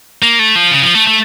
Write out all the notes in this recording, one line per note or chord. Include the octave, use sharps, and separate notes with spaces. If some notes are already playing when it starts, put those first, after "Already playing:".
A#3
A3
F3
C#3
F3
A3
A3